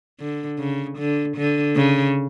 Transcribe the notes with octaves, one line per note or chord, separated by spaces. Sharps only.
D3
C#3
D3
D3
C#3